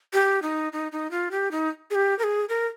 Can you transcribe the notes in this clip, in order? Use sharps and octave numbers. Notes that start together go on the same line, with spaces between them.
G4
D#4
D#4
D#4
F4
G4
D#4
G#4
G4
A#4
G#4
A#4